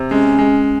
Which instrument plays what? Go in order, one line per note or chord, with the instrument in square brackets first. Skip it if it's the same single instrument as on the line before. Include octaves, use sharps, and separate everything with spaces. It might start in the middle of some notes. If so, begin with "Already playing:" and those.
Already playing: [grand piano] C3
[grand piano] G#3 [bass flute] C#4
[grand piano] G#3